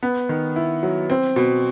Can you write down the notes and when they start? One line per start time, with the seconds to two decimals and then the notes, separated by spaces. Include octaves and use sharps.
0.03 B3
0.29 D#3
0.56 E4
0.83 F#3
1.10 C4
1.36 B2